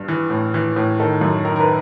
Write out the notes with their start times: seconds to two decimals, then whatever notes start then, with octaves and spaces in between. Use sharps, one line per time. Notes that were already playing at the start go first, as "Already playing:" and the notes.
Already playing: G2
0.08 E3
0.30 A2
0.54 E3
0.76 A2
1.00 D#3 A4
1.21 F#2
1.45 D#3 A#4
1.56 A#4
1.60 B4